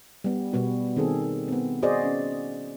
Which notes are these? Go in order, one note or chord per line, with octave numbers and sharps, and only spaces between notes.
G3 B3
B2 G3 B3 F#4
D#3 C4 G#4 A4
B3 C4
F#4 G#4 C5 D5 D#5
C#4